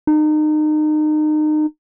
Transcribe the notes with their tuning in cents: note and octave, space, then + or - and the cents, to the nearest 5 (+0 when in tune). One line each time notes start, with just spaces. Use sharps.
D#4 -30